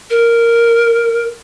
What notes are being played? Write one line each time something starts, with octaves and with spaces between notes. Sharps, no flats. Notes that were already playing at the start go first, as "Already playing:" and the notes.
A#4